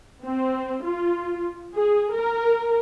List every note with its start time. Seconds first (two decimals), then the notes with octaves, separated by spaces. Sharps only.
0.24 C4
0.84 F4
1.74 G#4
2.13 A#4